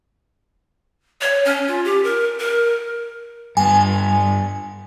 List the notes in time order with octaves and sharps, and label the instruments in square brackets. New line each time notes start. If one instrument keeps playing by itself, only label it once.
[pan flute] C#5
C#4
F4
G4
A#4
A#4
[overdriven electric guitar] G2 B3 [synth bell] G#5